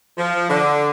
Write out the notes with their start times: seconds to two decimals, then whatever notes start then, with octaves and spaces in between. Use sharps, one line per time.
0.18 F3
0.50 D3